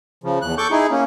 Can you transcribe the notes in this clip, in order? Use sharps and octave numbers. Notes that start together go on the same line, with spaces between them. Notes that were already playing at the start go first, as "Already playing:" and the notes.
C#3 F3
E2 F#6
A4 C#6 D6 G6
D#4 E4 G#4
A#3 C#4